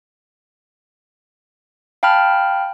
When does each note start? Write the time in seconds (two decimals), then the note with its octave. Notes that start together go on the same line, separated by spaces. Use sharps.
2.03 F5 G5 A5 B5 F6